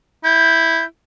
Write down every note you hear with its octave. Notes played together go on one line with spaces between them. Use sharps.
E4 G6